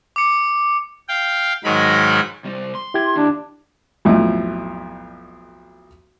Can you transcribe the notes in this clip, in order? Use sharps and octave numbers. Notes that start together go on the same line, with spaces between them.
D6 C#7
F5 G5
G#2 D#3 F#3 D#4 A#4 B5
C3 G3
C6
E4 G4 G#6
D#2 D4
B1 F2 A2